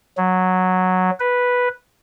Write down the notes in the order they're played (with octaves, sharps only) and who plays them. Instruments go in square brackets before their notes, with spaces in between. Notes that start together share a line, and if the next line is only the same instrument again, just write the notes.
[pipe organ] F#3
B4